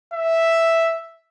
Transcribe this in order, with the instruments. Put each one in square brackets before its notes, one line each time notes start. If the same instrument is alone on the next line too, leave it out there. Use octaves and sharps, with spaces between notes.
[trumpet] E5